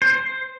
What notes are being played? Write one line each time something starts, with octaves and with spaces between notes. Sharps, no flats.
C5